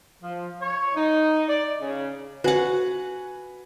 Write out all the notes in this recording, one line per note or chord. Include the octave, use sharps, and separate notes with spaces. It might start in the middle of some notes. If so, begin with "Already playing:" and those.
F3
C#5
D#4
D5
C#3
F#4 B4 F#5 G#5